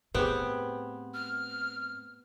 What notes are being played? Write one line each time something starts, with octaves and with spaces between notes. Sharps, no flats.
A2 B3 C4 G4 G#4
F6